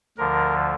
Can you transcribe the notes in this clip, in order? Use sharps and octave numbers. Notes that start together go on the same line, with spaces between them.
D2 D3 F3 A#4